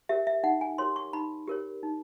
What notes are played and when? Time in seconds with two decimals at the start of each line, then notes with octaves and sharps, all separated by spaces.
0.09 G4 A#4 C#5 E5
0.27 E5
0.44 D#4 F#5
0.61 G#5
0.78 G4 A#4 C#5 C6
0.96 C#6
1.13 D#4 B5
1.48 G4 A#4 C#5
1.83 D#4